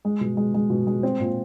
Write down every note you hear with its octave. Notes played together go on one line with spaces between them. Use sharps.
G#3
B2
G#3
G#3
B2
G#3
C4
A#2